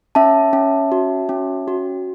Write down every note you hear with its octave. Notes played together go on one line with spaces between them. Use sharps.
C#4 E5 A5
C#4
F#4
C#4
F#4